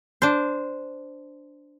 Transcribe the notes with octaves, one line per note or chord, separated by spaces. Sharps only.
D4 C5